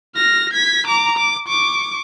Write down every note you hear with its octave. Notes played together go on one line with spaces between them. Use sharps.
F6 A#6
G#6 B6
A#5 D6
D6
C#6 D6